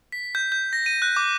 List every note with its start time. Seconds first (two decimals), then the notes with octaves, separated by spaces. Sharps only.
0.12 B6
0.35 G6
0.52 G6
0.73 A#6
0.86 D#7
1.02 F#6
1.17 D6